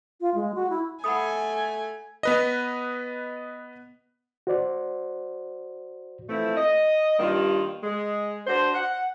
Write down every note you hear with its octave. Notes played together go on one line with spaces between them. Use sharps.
F4
G#3
F#4
E4
A3 F#5 G#5 B5 D#6
B3 B4 D#5
F#4 C5 D5
E3 F3 A3 C4 E4
D#5
G2 D#3 G3 A#3 F4
G#3
D4 F#4 C5
F#5